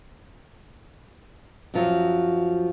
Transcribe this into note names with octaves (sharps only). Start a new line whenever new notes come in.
F#2 F3 F#3